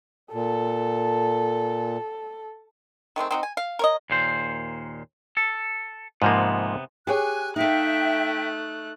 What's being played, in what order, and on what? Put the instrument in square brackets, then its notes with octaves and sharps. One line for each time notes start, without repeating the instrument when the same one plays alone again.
[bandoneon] A#2 [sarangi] A4
[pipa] D#3 G#3 A3 C4
C4 D#4 F#4
G#5
F5
A#4 C#5 D#5
[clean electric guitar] D#2 A#2 C5
A4
[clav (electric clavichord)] G#2 F3 A#3 [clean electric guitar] C3 B3
[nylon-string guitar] G4 G#4 C#5 [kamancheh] G#5 [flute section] F#6
[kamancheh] A3 F#6 [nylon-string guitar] D#4 F5 [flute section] E5 G5